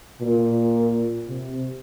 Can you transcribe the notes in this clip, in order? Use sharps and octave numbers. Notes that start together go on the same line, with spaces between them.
A#2
C3